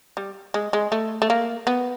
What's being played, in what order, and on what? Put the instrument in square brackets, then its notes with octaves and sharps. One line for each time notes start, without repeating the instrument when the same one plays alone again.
[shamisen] G3
G#3
G#3
A3
A3
A#3
B3